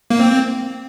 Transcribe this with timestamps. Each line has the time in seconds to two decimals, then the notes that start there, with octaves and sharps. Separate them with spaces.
0.10 A#3
0.19 C4